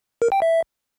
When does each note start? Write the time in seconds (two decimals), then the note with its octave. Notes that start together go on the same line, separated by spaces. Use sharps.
0.22 A#4
0.32 G5
0.42 E5